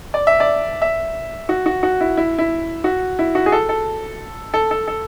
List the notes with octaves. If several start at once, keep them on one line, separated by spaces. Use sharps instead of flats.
D5
E5
D5
E5
F#4
F#4
F#4
E4
E4
E4
F#4
E4
F#4
G#4
A4
A4
A4
A4
A4